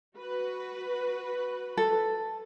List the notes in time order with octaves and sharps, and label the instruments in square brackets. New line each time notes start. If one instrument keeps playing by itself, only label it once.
[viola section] F#4 B4
[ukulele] A4